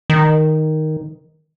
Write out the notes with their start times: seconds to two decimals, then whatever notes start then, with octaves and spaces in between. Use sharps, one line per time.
0.10 D#3